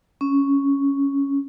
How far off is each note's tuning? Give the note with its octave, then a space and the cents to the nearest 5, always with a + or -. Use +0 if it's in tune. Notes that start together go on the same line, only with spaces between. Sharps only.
C#4 +5